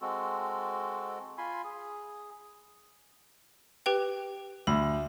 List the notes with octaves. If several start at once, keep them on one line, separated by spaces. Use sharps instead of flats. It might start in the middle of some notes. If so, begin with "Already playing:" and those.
G#3 C4 F#4 A4
F4 G#5 B5 C6
G#4
G4 B4 G5
D2 B5